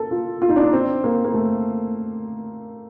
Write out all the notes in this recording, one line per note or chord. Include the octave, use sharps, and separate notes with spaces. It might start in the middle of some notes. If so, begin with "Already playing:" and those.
Already playing: A4 A#4
F4
F4
D#4
D4
D#4
C4
A#3
A#3
A3